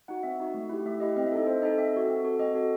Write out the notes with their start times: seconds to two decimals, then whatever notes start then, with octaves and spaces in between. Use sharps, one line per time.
0.08 D#4 F#4 F#5
0.23 C4 E5
0.40 D#4 F#4
0.54 A3
0.69 E4 G4
0.85 A3 E5
1.00 E4 G4 D#5
1.16 C4 D#5
1.27 E5
1.32 D#4 A4 D#5
1.47 C4 C5
1.62 D#4 A4 D#5
1.77 C4 E5
1.93 F#4 A4
2.09 C4
2.24 F#4 A4
2.39 C4 D#5
2.55 F#4 A4